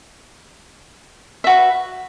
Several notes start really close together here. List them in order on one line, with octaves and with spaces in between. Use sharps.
E5 F#4 B4